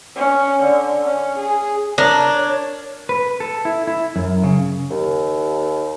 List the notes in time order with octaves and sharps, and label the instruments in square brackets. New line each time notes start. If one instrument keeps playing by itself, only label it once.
[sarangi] C#4
D3
C#4
G#4
[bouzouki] D4 [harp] A#4 [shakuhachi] C#5
[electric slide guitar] B4
A4
E4
E4
F#2
C#3
[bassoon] D#2